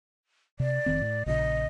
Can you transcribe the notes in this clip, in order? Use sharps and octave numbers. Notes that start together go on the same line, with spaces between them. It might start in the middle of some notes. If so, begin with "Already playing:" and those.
C3 D5
F1 D#3 C4
A2
A#1 A#2 C#3 D#5